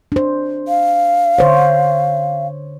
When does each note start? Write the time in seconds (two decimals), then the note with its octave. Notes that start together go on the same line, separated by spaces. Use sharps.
0.12 D4 C5
0.68 F5
1.38 D3 C5 C#5